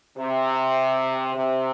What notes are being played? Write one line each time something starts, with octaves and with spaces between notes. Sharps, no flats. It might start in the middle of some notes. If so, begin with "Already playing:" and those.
C3
C3